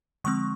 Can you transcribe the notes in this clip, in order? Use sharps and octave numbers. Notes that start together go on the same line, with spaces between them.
D3 F3 G#3 C4 C#6